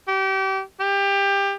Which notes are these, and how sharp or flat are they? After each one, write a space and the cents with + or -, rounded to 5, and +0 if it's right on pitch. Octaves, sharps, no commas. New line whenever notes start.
G4 -30
G4 +20